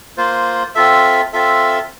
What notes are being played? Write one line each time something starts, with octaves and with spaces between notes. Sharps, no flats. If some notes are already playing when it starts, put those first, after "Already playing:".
A#3 F4 C5
C4 F4 A4 E5
C4 F4 A4 E5